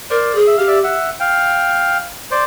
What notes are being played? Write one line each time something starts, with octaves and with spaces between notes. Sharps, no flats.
A#4 C5 D5
G#4
E5
G4 F5
D5 E5
E5 F#5
F5 G5
C5 D5